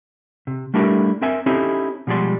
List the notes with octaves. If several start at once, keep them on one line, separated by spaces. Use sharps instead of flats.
C3
G3 A3 D4 E4 G4 A#4
C4 A#4 E5 G#5
C4 C#4 D#4 E4 G4 A4
B2 F3 G3 G#3 D5 C6